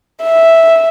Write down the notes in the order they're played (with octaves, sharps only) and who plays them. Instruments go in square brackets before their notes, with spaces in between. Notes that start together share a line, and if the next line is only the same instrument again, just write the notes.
[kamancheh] E5